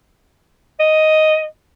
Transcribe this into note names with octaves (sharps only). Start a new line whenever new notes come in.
D#5